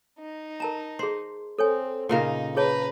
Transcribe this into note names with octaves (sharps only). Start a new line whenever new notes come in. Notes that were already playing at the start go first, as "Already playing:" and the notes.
D#4
A#4 A5 A#5
G#4 C5 C6
C4 A4 C#5 G#5
A#2 C#3 D#4 A#4
G#4 B4 C#5 A5 A#5